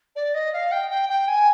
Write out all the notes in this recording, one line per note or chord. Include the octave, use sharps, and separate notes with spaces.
D5
D#5
F5
G5
G5
G5
G#5